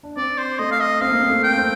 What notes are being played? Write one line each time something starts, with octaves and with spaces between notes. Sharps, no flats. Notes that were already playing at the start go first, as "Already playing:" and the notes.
D4
C4 D5
C5
A3 D#5
F5
D#5
C4 F5
A#3
C4
A3
G5
C4